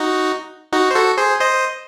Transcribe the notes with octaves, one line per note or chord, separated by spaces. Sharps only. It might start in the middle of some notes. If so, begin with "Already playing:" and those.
Already playing: D#4 F#4
D#4 F#4
C5
F#4 A4
G#4 C5
C5 D#5